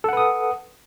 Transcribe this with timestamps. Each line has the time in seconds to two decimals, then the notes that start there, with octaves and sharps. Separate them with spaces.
0.04 A4
0.09 F#5
0.13 B4
0.17 D#6